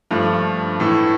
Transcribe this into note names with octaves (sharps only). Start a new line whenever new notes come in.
G2 F3 A3
A2 E3 A3